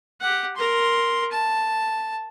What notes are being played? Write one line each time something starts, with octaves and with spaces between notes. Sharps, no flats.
G4 F#5
A#4 C6
A5